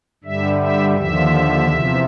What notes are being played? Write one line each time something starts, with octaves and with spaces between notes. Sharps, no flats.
G2 D3 G3 E5
E5
D#2 D3 F3 E5
E2 C3 F3